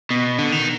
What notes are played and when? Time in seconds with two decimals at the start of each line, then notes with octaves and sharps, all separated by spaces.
0.10 B2
0.38 D3
0.52 D#3